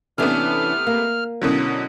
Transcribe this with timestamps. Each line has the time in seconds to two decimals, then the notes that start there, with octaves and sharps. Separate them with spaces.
0.18 C3 E3 A3 B3 C#4 D4 F6
0.87 A#3
1.42 B2 D3 F#3 C#4 E4 A#4